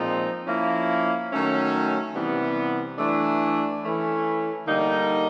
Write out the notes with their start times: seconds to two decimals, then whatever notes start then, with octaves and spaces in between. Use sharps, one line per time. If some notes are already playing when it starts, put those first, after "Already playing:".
Already playing: A#2 F3 G#3 C4 D#4
0.46 F3 A#3 C#4 E4
1.31 D#3 F#3 A3 C#4
2.15 C3 E3 G3 B3
2.98 E3 A3 D4
3.82 E3 A3 C#4
4.67 D3 G3 A#3 D#4